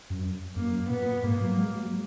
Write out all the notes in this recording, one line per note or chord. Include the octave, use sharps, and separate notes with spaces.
F#2
F#2 A#3
A#2 B3
G#2 A#3
F#3
G#3
F#3